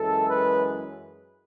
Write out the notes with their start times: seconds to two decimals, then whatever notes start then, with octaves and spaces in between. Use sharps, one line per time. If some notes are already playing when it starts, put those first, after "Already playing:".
Already playing: F#2 E3 G#3 A4
0.28 B4